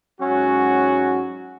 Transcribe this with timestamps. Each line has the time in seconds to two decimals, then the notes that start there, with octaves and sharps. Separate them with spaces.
0.19 G#2 F#3 C#4 F#4